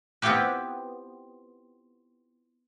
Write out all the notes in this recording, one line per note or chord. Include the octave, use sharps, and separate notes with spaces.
B3 C4 E4 F4 G4 B4